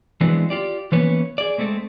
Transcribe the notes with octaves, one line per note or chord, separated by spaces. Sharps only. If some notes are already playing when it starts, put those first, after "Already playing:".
E3 F#3 G#3 B3 C4 D4
F4 G4 D5
E3 A#3 B3 C#4 B4 C#5
G#4 D5
G#3 A3 C4 A4